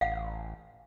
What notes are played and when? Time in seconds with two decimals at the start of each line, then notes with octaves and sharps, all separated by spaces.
0.01 A1 F5 F#5